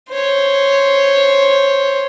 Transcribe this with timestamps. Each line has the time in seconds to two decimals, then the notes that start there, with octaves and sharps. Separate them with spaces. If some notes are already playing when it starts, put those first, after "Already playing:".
0.12 C5 C#5